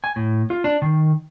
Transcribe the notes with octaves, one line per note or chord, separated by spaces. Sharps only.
G#5
A2
F4
D4
D#3